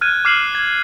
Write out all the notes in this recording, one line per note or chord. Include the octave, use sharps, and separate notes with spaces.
F6 F#6 G#6 D#7
D6 F6 C7 E7 F#7
G#6